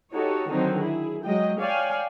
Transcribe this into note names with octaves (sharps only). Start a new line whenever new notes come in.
D#4 F#4 G4 A4 C#5
D3 D#3 F#3 C4 D#4
E4 G#4
F#3 G#3 D#5 G5
C#5 D5 F5 G5 G#5